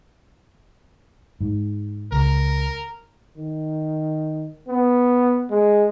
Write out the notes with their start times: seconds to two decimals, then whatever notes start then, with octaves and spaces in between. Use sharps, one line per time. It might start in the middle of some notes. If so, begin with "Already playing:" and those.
1.41 G#2
2.12 C#2 A#4
3.38 D#3
4.69 B3
5.50 G#3